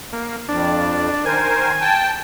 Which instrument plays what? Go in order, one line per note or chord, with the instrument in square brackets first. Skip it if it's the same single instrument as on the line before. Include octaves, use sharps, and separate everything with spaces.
[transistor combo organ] A#3
[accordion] F2 [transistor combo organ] D4
[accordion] D#3 A#4 C5 [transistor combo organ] G#5
[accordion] G5 A5